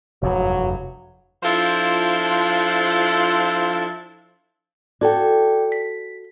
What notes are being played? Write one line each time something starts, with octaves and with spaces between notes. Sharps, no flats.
F1 E2 G2 F#3
F3 D4 E4 F4 A4 C5
F#4 A4 D5 G5
B6